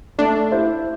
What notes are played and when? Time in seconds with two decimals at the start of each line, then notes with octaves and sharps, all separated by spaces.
0.18 A3 D4
0.51 E4 G4 C5 E5